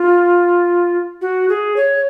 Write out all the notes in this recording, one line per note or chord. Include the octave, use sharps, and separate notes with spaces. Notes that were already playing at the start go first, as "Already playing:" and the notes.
Already playing: F4
F#4
G#4
C#5